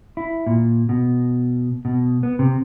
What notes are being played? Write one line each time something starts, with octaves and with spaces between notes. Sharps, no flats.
E4
A#2
B2
B2
B3
C3